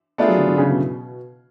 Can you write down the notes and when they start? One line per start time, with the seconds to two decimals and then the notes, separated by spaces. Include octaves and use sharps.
0.18 A3 B3 D4 F4 G#4
0.28 F#3
0.37 D3
0.48 D3
0.58 C#3
0.68 B2